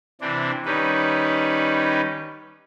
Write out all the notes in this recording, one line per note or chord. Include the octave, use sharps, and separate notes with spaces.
C3 E3 C4 D4
D#3 G3 C#4 D#4 B4